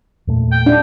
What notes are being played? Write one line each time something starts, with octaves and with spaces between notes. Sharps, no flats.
E2 A#2 A3
G5
D4